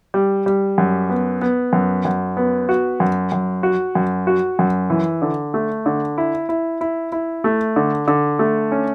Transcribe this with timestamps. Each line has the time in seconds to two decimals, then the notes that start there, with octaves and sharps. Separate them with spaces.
0.14 G3
0.46 G3
0.78 F#2
1.09 B3
1.41 B3
1.73 F#2
2.05 F#2
2.37 B3
2.69 F#4
3.00 F#2
3.32 F#2
3.63 F#4
3.95 F#2
4.27 F#4
4.59 F#2
4.90 E3
5.22 D3
5.54 A3
5.86 D3
6.18 E4
6.49 E4
6.81 E4
7.12 E4
7.44 A3
7.76 D3
8.08 D3
8.39 A3
8.72 C#4